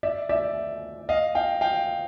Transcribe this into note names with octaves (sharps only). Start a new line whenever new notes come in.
D5 E5
D5 E5
D#5 F5
F5 G5
F5 G5